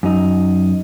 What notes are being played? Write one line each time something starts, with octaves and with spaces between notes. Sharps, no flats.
F#2 D#4